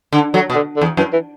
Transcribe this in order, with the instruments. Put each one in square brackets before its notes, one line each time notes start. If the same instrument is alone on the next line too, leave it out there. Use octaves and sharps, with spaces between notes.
[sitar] D3
[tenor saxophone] D3 [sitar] F#3
[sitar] B2
[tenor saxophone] D3
D3
[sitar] E2
[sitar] F#2 [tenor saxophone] E3
[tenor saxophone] E3